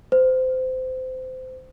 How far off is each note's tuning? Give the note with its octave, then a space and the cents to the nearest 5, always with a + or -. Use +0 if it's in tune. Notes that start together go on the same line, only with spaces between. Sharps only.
C5 -25